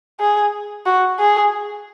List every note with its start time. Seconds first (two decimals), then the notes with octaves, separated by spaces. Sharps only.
0.20 G#4
0.86 F#4
1.19 G#4